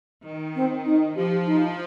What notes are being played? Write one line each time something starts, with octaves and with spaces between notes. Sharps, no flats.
D#3
C4
D#4
F3 G4
D#4